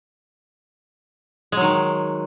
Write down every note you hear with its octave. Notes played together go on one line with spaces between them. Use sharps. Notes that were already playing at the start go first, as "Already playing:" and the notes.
D#3 F#3 G#3